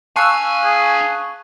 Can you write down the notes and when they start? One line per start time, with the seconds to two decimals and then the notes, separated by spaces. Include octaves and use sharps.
0.16 D4 F5 G#5 A5 C#6 E6 F#6
0.64 G#4